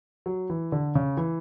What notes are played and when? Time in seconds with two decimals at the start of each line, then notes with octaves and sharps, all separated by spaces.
0.26 F#3
0.50 E3
0.72 D3
0.95 C#3
1.17 E3